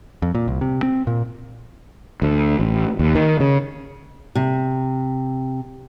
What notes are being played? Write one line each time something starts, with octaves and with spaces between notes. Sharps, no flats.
F2
A#2
C2
C3
C4
A#2
D2
A1
D#2
D#3
C#3
C3